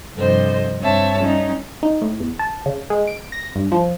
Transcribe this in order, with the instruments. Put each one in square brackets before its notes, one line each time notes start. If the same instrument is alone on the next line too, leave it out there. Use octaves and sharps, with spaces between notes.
[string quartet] G2 C3 F3 A4 C5 D#5
G2 C4 C#5 E5 A5
G3 C#4 D#4
[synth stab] D#4
A2
E2
A5
C#3
G#3
D7
A#6
G2
F3